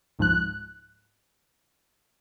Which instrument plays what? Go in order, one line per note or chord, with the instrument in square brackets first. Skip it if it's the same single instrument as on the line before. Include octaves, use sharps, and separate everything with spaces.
[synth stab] C#2 G#2 F3 F#6